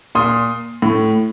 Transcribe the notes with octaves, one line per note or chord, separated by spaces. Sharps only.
A#2 C6 D#6
A2